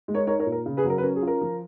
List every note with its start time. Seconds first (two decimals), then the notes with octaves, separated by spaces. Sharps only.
0.08 G#3
0.14 A#4 C#5
0.27 D#4 A#4 C#5
0.39 A#4 C#5
0.46 A#2
0.52 A#4
0.66 C#3
0.77 G#4 B4
0.84 F#3
0.90 A#4
0.98 B4
1.03 C#4 A#4
1.16 G#4
1.22 F4
1.27 A#4
1.41 F3